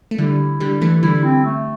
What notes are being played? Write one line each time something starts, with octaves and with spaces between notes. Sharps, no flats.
A3
D3 G3 E4
D3 G3
E3 A3
D3 G3 E4
C4
A3